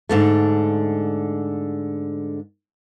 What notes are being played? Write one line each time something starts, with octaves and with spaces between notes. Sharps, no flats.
G#2 D3 A3